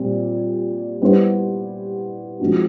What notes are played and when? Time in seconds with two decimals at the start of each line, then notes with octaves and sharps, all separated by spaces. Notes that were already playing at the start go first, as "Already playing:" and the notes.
Already playing: A#2 G3 C4
1.02 G3 B3 E4 G4 C5
2.40 F3 G#3 C4 D#4 F#4